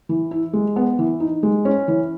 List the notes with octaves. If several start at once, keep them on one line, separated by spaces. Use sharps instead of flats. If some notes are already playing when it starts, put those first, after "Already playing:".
E3
E4
G#3
B3
E3
D#4
G#3
C#4
E3